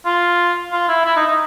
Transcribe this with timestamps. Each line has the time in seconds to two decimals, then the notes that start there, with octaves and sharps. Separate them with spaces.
0.06 F4
0.72 F4
0.89 E4
1.05 E4
1.17 D#4
1.27 D#4